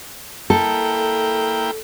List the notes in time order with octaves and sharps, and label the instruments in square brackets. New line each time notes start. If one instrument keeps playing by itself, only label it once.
[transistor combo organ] A#3 E4 G5 [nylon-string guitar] A4